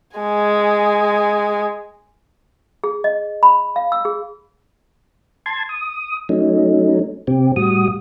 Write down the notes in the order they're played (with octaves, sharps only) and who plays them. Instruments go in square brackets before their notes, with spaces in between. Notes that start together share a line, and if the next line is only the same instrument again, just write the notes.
[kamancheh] G#3 G#5
[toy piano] G#4
D#5
B5
F5
E6
G#4
[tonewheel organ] A5 C6 G#6
D#6
F#3 A3 C#4 D#4
C3 C4 G4
A2 G3 F#4 D#6